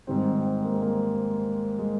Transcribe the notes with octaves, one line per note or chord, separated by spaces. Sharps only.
G#2 D#3 G3 C4
C4
A#3
G#3
A#3
G#3